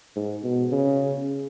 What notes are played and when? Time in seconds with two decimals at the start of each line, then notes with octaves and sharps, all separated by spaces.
0.16 G#2
0.44 B2
0.72 C#3